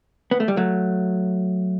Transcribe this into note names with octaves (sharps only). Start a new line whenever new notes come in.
B3
A3
G3
F#3 A3